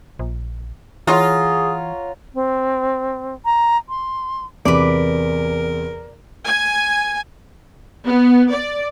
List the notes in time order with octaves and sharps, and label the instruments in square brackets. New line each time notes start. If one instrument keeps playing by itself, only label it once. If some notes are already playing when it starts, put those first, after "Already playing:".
[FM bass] A#1
[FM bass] E3 [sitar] F4 [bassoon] G#4 [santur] C#5 F#5 A#5
[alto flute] C4
A#5
C6
[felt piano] E2 C3 [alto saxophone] A#4 [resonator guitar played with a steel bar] B4 D5
[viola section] G#5
B3
D5